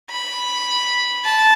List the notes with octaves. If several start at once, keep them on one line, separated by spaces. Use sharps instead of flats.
B5
A5